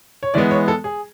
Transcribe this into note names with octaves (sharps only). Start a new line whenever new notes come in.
C#5
E3 G#3 B3 D5
C#5
A4
G#4